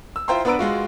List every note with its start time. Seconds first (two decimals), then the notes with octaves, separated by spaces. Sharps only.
0.16 E6
0.28 E4 F4 C5 G5 A#5 C6
0.45 B3 D4 B4 A#5 E6 D7
0.59 G#3 F4 F#4